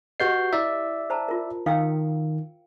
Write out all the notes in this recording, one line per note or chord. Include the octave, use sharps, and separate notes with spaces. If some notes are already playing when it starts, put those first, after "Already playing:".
F#4 G4 B4 D#5 G6 C7
E4 D5 E5
C5 A5 A#5
F4 A#4
D#3 F5 G5 E6